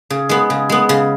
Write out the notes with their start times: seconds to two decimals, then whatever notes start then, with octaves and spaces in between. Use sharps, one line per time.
0.10 C#3
0.29 G#3 B3
0.50 C#3
0.70 G#3 B3
0.89 C#3